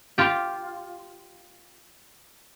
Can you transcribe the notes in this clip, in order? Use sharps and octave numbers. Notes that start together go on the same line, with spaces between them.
F4 G4